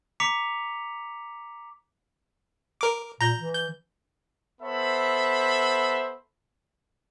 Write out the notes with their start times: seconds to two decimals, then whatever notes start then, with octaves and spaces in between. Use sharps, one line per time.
0.20 A#5 D6 B6 C#7 F7
2.81 A#4 D6
3.21 A#2 A#5 G6
3.37 E3
3.55 G6
4.61 B3 A4 C5 E5 B5